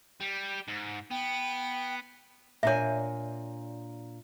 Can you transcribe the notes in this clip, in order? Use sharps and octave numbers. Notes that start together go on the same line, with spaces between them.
G3
G#2
B3 G5
A#2 D4 C#5 E5 G#5